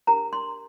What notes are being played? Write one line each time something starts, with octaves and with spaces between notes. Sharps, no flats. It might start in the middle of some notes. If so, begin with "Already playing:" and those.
D4 G4 A#4 A#5
C6